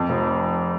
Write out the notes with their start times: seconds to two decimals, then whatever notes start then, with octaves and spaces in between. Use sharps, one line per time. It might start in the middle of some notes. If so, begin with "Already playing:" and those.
Already playing: F2
0.09 F1